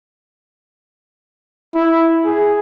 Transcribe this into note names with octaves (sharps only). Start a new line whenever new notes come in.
E4
G#4